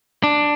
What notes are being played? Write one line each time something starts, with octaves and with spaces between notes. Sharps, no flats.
D4